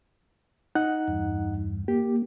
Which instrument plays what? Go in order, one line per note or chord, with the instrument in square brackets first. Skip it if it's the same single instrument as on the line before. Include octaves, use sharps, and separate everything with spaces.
[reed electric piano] D#4 F#5 F#6
[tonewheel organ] E2 G2
[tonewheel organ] A#3 [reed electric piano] G4